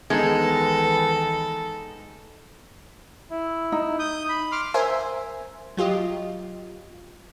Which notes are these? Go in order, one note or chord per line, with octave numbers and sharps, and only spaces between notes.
C#2 D#3 E3 G#3 B3 D#4 A4
E4
D#4
D#6 G6
B5
C6 D6 F6
A#4 C5 E5 G#5 C6
F#3 F4 G4 D#5